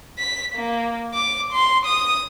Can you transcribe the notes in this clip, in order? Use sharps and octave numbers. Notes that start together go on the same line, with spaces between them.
B6
A#3
D6
C6
D#6